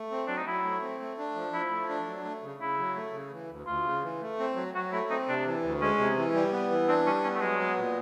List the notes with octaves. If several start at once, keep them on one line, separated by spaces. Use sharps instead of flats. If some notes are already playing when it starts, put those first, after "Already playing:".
Already playing: A3
C4
F#3 D4
D#4
F#3 E4
A3
C4
A3
D4
F3
F3 E4
A3
D4
F#3
A3
C#3
C#3 E4
F#3
A3
C#3
E3
D2
D2 F4
C#3
E3
A3
C4
F#3
F#3 F#4
A3 E4
C4 D#4
C3 D4
E3
D2
G#3 C#4
C3
E3
G3
B3
E3
C4 D4
G3 C#4
B3 C#4
A3
F#3 G#3
B3
A#2